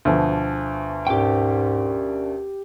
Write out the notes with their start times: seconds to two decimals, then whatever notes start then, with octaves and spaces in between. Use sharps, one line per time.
0.05 D2 B2 F3
1.07 G#2 C#4 G4 A#4 D5 G5